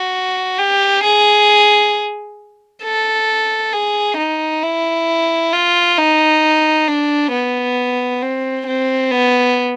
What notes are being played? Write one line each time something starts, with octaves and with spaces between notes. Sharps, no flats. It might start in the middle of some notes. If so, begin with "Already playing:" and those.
Already playing: F#4
G4
G#4
A4
G#4
D#4
E4
F4
D#4
D4
B3
C4
C4
B3